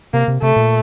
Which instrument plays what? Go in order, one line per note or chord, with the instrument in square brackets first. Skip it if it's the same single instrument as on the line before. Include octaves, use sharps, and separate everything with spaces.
[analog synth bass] C3 [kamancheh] A#3
[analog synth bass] C3
[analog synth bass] C3 [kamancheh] A3
[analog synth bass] A#2